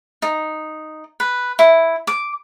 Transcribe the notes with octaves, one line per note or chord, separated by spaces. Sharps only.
D#4
B4
E4
D6